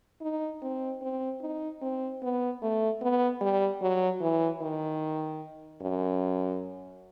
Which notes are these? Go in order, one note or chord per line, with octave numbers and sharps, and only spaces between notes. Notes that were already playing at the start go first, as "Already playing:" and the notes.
D#4
C4
C4
D#4
C4
B3
A3
B3
G3
F#3
E3
D#3
F#2